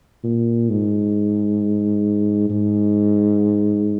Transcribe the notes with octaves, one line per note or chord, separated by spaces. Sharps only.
A#2
G#2
G#2